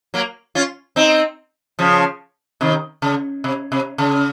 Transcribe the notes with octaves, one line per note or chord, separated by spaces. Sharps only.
F#3 A#3
C#4 F4
C4 D#4
C#3 F3
C3 D#3
C#3
C3
C3
C#3